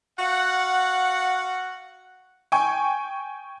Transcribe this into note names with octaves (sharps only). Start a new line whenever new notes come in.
F#4 F5 F#5
G5 G#5 C#6